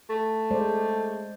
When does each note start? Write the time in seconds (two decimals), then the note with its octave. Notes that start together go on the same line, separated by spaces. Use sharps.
0.10 A3
0.51 G#3 C5 D5